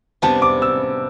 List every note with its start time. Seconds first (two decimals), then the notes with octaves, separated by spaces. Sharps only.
0.22 C3 G3 B3 D4 A5
0.42 D6
0.62 E6